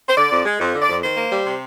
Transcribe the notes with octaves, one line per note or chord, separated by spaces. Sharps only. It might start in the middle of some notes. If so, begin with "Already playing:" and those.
C5
D3 D5
F2
G#3
F2
D3
D5
F2
D#3 C5
A#3
G3
C3